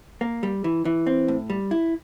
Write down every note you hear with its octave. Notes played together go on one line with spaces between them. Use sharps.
A#3
G3
E3
E3
C4
A2
G3
E4